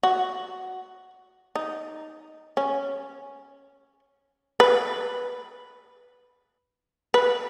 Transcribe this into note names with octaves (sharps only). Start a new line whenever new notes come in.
F#4
D#4
C#4
B4
B4